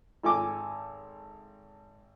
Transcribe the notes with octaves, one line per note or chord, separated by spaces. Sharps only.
G#1 A4 G#5 D6